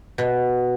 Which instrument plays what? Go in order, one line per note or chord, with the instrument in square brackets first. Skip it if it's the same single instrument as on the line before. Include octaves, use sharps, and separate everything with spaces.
[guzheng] B2